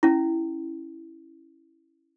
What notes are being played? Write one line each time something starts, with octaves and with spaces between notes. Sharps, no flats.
C#4 E4